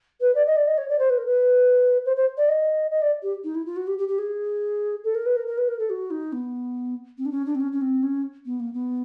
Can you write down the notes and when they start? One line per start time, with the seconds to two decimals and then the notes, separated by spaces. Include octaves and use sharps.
0.21 B4
0.35 D5
0.46 D#5
0.56 D5
0.67 D#5
0.77 C#5
0.89 D5
0.99 C5
1.10 B4
1.18 A#4
1.26 B4
2.05 C5
2.16 C5
2.37 D5
2.48 D#5
2.91 D#5
3.01 D5
3.23 G4
3.44 D#4
3.54 E4
3.66 F4
3.76 F#4
3.87 G4
3.98 G4
4.08 G4
4.18 G#4
5.04 A4
5.15 A#4
5.26 B4
5.36 A#4
5.47 A#4
5.58 B4
5.68 A#4
5.79 A4
5.90 F#4
6.10 D#4
6.32 B3
7.18 C4
7.25 D4
7.31 C#4
7.46 D4
7.55 C4
7.60 C#4
7.72 C#4
7.81 C4
8.03 C#4
8.45 B3
8.60 A#3
8.73 B3